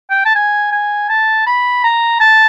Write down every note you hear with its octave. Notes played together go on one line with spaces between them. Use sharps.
G5
A5
G#5
G#5
A5
B5
A#5
A5